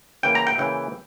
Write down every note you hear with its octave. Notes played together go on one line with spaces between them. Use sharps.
C#3 E3 A#3 G5
A#5
G5
C#3 E3 A#3 G5